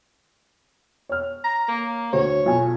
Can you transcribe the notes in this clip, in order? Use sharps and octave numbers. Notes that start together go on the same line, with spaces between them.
C#5 F6
A#5
A#3
D2 C5 C#5
B1 F4 G#5